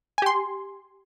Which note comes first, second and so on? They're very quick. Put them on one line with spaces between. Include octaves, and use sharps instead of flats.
G#5 G4 C6